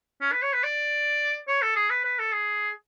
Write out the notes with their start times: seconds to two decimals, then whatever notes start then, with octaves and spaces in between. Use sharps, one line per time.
0.21 C#4
0.32 B4
0.42 C#5
0.53 B4
0.64 D5
1.48 C#5
1.62 A4
1.76 G#4
1.90 B4
2.04 B4
2.19 A4
2.33 G#4